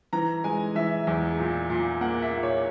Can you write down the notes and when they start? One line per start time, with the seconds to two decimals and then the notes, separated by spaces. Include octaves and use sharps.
0.13 E3 A#5
0.44 G#3 G#5
0.75 E3 E5
1.07 E2
1.39 A#2
1.70 A#2
2.01 A#3 F#5
2.22 E5
2.33 A#2
2.43 C#5